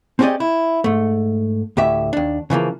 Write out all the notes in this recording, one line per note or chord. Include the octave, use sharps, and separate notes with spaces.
C4 C#4 G4 G#4 D5 D#5
E4
G#2 A3
D2 A2 G4 E5
D#2 D4
C#3 E3 F3 A#3